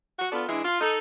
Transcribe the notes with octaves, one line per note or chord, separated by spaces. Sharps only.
F#4
B3 D4 F4 A4
E3 G#3 D4 E4
F4
D#4 A4